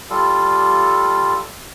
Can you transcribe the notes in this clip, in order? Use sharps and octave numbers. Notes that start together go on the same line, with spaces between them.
G3 F4 A4